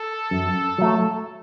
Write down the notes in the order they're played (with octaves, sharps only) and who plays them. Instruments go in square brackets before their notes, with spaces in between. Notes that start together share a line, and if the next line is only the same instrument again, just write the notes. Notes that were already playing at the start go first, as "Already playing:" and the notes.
Already playing: [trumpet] A4
[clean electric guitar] F#2
F#3 A3